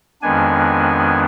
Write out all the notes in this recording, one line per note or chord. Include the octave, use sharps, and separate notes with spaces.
F2 D#3 G#3 B3 D4 G#5